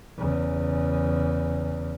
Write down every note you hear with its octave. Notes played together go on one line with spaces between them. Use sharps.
E2 C#3